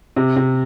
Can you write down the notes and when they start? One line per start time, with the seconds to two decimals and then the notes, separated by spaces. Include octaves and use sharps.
0.16 C3
0.36 C3